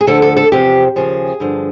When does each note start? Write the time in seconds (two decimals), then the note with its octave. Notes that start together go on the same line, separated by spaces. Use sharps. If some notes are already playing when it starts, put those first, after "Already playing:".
0.01 G#4
0.07 D2 D3 F3 A4
0.22 A4
0.37 A4
0.52 E2 C3 F3 G4
0.96 D#2 C#3 F3 G#4
1.40 G2 D3 F3